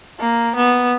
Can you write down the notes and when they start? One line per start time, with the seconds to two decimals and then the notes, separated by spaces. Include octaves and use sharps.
0.19 A#3
0.56 B3